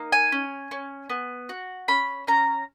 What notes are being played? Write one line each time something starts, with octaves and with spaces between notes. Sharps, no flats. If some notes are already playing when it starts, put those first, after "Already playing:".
Already playing: A#3 D#4
G#5
C#4
C#4
B3
F#4
C#4 B5
C#4 A#5